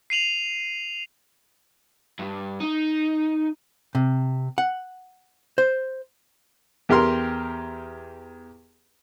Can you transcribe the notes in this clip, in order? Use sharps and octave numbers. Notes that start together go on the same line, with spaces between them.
C7 D#7 F7 F#7
G2
D#4
C3
F#5
C5
E2 G4 A#4 C6